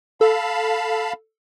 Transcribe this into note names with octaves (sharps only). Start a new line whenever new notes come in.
A4 F5 A5 B5